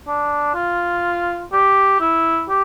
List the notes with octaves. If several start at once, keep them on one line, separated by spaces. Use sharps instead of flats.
D4
F4
G4
E4
G4